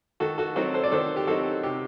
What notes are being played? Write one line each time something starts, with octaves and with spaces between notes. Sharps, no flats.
D#3 F#4 A4
F#4 A4
F#3 C4 D#4 F#4 A4
A4 C5
D5
D#3 A4 C5
G4
F#3 C4 D#4 F#4 A4
C3 G4